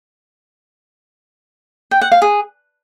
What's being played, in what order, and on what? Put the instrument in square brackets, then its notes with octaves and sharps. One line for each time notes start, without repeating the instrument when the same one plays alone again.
[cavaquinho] G5
F#5
F5
G#4